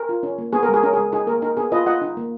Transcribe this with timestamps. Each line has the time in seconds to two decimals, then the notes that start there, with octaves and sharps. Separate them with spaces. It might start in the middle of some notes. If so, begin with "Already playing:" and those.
Already playing: A#4
0.09 F4
0.23 C#4
0.38 A#3
0.53 B3 G#4
0.63 A#4
0.69 G#3
0.74 G#4
0.83 C#4 A#4
0.93 G#3 G#4
1.13 D#4 G#4
1.27 A#3 A#4
1.42 D#4 A#4
1.57 B3 G#4
1.72 F4 B4 D#5
1.86 F4 D#5 F#5
2.02 D#4
2.17 A#3